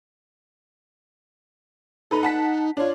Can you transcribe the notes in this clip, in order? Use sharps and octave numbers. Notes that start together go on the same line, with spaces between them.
D#4 A4 B4 A#5
F#5 A5 B6
D4 F4 C#5